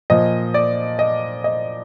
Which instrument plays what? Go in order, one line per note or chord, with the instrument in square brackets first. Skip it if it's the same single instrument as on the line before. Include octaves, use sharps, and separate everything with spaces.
[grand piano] A#2 F3 D#5
D5
D#5
D#5